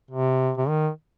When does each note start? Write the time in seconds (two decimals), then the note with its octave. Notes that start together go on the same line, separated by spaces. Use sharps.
0.11 C3
0.57 C3
0.68 D#3